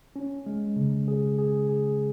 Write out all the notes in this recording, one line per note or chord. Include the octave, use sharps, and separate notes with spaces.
C#4
G#3
C#3
G#4
G#4
G#4